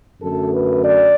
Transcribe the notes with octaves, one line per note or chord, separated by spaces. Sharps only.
F#2 D3 F#3 A3 A4
B4
D5